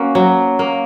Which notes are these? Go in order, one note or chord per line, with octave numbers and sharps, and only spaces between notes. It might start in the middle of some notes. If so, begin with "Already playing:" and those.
Already playing: A#3 C#4 F#4
F#3
A#3